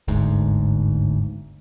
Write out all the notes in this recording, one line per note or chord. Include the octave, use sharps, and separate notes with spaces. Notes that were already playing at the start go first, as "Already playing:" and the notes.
G1 D2 G#2